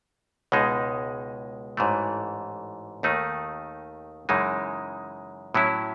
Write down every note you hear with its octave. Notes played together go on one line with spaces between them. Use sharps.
C#2 B2 G#3 D#4
A1 G#2 E3 A3
D#2 D#3 A3 D#4
F#2 C#3 E3 G#3 D#4
A2 F#3 C#4 E4